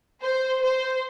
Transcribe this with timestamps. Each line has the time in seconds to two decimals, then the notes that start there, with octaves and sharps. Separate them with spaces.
0.22 C5
0.62 C5